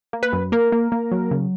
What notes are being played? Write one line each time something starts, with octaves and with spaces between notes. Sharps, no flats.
A#3
B4
F#2
A#3 A#4
A#3
A#3
F#3
C#3